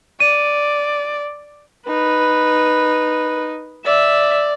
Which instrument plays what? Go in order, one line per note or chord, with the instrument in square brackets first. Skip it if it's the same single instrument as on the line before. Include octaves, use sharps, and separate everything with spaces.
[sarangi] D5 [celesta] D#7
[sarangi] D#4 [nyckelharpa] B4
[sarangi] D5 [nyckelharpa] E5